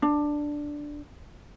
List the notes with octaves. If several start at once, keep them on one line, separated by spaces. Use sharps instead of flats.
D4